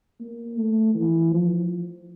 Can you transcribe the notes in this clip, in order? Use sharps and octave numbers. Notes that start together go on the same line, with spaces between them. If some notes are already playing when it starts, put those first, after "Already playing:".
A#3
A3
E3
F3